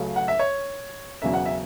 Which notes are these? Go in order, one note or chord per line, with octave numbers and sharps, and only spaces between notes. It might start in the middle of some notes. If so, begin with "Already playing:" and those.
Already playing: C#2 C#3 F#3 A3
F#5
E5
C#5
E1 E2 C#3 F#3 E5
F#5
E5